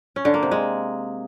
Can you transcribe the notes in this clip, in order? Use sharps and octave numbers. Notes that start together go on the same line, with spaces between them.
C#4
D3
A#3
C3
G#3